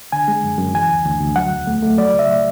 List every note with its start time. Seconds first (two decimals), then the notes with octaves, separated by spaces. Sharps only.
0.12 D3 G#5
0.28 G#3
0.44 F#2
0.58 F#2
0.74 E3 G#5
0.90 D2
1.05 D2
1.20 D2
1.36 F#3 F#5
1.52 E2
1.67 A3
1.83 A3
1.98 F#3 D5
2.14 C#2
2.19 E5